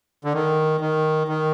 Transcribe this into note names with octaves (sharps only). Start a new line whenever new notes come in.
D3
D#3
D#3
D#3